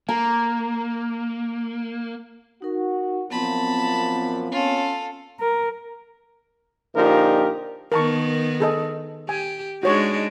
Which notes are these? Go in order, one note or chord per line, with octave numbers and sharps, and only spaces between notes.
A#3 A#5
D#4 F#4 A#4
F#2 A#2 F3 B3 C4 A5 B5
C#4 F4 A4
A#4
A#2 D3 F3 D#4 G4 A#4
D#3 B3 A#4 A5 C#6
G#4 A4 D#5
G4 G#5
G#3 D4 D#4 F#4 C#5 C#6